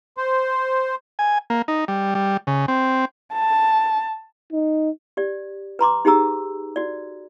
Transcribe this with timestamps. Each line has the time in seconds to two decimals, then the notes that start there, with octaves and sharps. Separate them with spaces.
0.17 C5
1.19 G#5
1.50 A#3
1.68 D#4
1.88 G3
2.15 G3
2.47 C#3
2.68 C4
3.33 A5
4.52 D#4
5.17 G4 D5
5.79 B4 A#5 C6 D6
6.05 D#4 G4 G#4 A#5 E6
6.76 F#4 D5